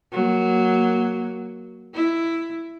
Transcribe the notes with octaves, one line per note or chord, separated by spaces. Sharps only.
F#3 A#3
E4